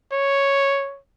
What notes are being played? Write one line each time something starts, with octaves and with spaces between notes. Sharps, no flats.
C#5